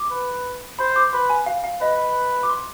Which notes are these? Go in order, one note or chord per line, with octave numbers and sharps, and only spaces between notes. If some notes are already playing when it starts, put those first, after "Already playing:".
Already playing: D6
B4
C5 B5
D6
B4 C6
G#5
F5
F5
B4 D#5
D6
C6